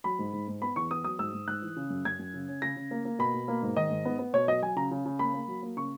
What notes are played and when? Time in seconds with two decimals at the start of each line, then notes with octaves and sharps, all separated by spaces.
0.04 F#3 B5
0.19 G#2
0.33 G#2
0.48 G#2
0.62 B3 B5
0.76 E2 C#6
0.91 B3 D#6
1.04 F#3 D#6
1.19 G#2 E6
1.33 G#2
1.47 G#2 F#6
1.62 E3
1.76 C#3
1.90 F#2
2.05 F#2 G#6
2.19 F#2
2.34 C#3
2.48 C#4
2.62 C#3 A#6
2.76 C#3
2.91 A#3
3.05 A#3
3.19 B2 B5
3.34 B2
3.48 A#3
3.62 G#2
3.77 D#3 D#5
3.91 G#2
4.05 B3
4.19 B3
4.33 B2 C#5
4.48 F#3 D#5
4.62 F#3 G#5
4.76 C#3 A#5
4.91 C#3
5.05 C#3
5.19 A#3 B5
5.34 A#3
5.48 F#3
5.63 A#3
5.77 C#3 C#6